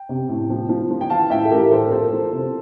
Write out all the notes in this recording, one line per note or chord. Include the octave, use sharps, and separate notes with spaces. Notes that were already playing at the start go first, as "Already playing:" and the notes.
Already playing: G5
C3
A2
F3
F3
F3
G5
E3 F5 A5
A2 E5 G5
A4
A2 G4 A#4
E3 A4 C5
A#4
F3 A4 C5
F3
C3